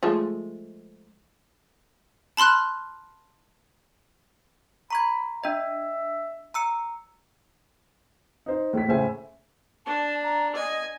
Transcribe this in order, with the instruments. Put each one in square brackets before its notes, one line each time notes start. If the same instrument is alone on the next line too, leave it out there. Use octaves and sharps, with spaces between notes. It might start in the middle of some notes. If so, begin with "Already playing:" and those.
[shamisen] F3 G#3 A3
[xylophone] A5 B5 C6 F6 F#6
[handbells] A#5 C#6 G#6 [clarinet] B5
[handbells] D4 D#5 [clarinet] E5
[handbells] A#5 E6 C#7
[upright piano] D#4 C5
A2 B6
A2 C#3 C5 E5 G#5
[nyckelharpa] D4 [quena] A5
[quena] A#5
[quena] D#5 [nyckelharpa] G#5